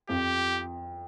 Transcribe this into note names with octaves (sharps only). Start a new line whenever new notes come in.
F2 F3 G4